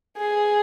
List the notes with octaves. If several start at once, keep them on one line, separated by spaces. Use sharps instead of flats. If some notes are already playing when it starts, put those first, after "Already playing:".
G#4